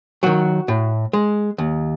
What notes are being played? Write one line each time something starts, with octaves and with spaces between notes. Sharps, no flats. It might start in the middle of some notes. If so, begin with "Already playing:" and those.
D#3 F#3 F#4
A2
G#3
D#2